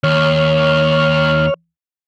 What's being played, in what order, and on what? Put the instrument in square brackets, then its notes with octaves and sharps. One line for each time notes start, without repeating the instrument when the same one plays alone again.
[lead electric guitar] D#2 [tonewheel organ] C#5 F6